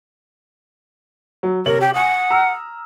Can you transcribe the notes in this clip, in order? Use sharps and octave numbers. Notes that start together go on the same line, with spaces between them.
F#3
C3 A#4 C#5 F#7
G4
F#5 G#5 D#6
A#5 E6 F6